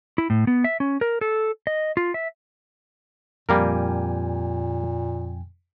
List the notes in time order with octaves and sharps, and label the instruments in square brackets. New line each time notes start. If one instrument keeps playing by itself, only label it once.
[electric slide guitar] E4
A2
B3
E5
C#4
A#4
A4
D#5
F4
E5
[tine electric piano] F2 G5 G#5 [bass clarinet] A#2 [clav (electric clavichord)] G3 A#3 A#4